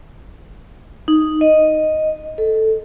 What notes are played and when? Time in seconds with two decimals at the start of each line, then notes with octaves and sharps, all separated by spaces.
1.08 D#4
1.41 D#5
2.38 A4